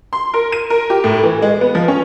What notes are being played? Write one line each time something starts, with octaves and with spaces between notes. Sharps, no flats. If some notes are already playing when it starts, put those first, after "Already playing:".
C6
A#4
D#7
A#4
G4
A2
E3
G#3
B3
F3
C#4